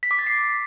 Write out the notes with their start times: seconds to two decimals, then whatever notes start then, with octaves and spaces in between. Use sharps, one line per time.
0.03 B6
0.11 D6
0.19 A6
0.27 C7